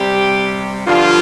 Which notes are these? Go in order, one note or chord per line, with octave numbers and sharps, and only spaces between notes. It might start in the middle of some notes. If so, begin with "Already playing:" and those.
Already playing: C3 G3 G4
G2 D3 F3 F4